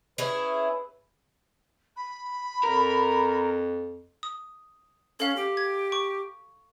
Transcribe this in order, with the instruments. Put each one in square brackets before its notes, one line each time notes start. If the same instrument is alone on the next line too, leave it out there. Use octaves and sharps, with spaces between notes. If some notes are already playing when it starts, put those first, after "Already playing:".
[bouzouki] C#4 E4 G#4 [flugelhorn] B4
[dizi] B5
[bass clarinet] F2 [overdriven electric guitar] A#4
[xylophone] D#6
[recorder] C#4 [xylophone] A4 F5
[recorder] G4
[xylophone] G#6
C#6